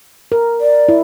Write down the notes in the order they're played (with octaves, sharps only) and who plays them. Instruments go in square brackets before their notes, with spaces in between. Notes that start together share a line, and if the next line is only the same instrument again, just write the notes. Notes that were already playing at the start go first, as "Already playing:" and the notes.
[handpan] A#4
[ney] D5
[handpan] E4